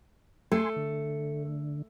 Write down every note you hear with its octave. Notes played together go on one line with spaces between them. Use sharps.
A3 G#5 C6
D3